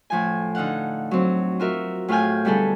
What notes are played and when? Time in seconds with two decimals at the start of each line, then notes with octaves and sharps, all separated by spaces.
0.10 A2 F3 G#5
0.55 D3 D#4 F5 F#5
1.11 F#3 C4
1.60 F4 F#4 A#4 E5
2.08 A2 F4 G#4 F5 G5 G#5
2.45 B2 D3 G3 E4 G#4 A4